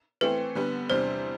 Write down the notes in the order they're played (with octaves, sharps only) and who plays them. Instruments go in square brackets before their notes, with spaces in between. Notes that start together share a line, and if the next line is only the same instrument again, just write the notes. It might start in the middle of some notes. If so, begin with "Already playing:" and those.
[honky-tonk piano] E3 A3 C4 [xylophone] B4
[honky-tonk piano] D3 G3 B3
[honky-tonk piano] E2 C3 G3 D4 [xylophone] C5